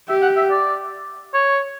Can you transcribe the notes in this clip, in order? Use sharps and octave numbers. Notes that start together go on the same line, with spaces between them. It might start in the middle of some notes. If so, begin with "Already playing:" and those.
G4 E5
F#5
E5
D5
C#5